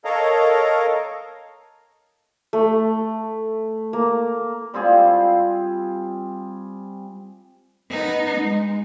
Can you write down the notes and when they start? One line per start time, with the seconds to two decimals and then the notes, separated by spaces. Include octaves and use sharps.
0.05 A4 A#4 C#5 D#5 F5 A#5
2.53 A3
3.93 A#3
4.74 G3 C4 F4 G#4
7.91 B3 D#4
8.40 G#3